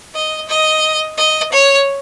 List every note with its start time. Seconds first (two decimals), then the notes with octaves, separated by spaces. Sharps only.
0.15 D#5
0.49 D#5
1.18 D#5
1.52 C#5